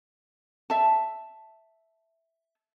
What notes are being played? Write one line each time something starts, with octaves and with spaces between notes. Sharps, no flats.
E5 A5